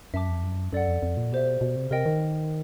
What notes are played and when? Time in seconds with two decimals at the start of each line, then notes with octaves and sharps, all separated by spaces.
0.14 F#2 E5 A5 D6
0.28 F2
0.43 F#2
0.73 F#2 A4 D5 F#5
0.88 F2
1.02 F2
1.17 A#2
1.32 B2 G4 C5 E5
1.61 B2
1.76 C3
1.91 C3 A#4 D#5 G5
2.06 D#3